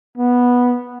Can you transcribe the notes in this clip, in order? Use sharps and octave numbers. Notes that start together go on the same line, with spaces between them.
B3